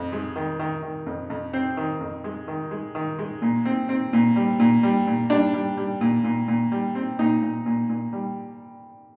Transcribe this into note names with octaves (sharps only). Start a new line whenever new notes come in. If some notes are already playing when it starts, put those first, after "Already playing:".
Already playing: F2
G#3
D#3
D#3
D#3
F2
F2
C4 C5
D#3
F2
G#3
D#3
G#3
D#3
G#3
A#2
C4
C4
A#2
G3
A#2
G3
A#2
G3 D4
G3
G3
A#2
A#2
A#2
G3
C4
A#2 D#4
A#2
A#2
A#2
G3